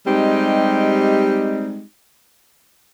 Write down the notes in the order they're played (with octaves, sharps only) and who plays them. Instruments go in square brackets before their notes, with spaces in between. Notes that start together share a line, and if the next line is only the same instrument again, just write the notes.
[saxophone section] G3 G#3 C4 D#4 G4